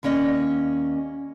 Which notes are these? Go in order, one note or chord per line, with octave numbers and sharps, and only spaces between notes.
D#2 A#3 C#4 D5 D#5